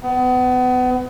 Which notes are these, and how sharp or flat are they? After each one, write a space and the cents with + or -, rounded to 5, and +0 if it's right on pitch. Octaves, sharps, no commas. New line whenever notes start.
B3 +30